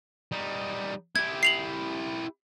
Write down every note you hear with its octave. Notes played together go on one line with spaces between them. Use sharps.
G3 D#4
E4 G4 G#6
C7 F7 F#7